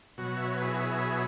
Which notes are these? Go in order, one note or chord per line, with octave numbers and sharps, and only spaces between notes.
B2 F#3 F#4
E5
C#5
B4
E4 G#4